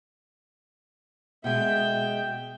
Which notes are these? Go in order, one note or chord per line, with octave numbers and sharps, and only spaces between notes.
B2 G#3 E5 G5